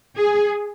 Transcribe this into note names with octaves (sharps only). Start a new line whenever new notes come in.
G#4